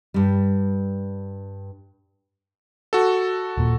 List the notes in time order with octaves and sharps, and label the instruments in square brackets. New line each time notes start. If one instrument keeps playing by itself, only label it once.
[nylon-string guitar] G2 G3
[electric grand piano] F#4 A4
[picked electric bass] D#1 A#2